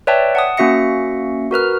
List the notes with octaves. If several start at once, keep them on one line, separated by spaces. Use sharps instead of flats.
B4 C#5 D5 E5 G5 A5
F#5 A5 D#6
A#3 C#4 F#4 E5 A#6 C#7
F#4 A#4 B4 F6